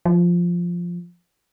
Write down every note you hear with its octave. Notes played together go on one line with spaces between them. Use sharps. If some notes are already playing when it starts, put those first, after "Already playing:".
F3